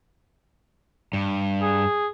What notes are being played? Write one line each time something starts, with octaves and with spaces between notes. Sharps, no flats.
G2
G#4